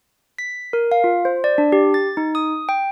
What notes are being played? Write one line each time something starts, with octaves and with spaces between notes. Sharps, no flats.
B6
A#4
F5
F4
C5
D5
D4
G4
A6
D#4
D#6
G5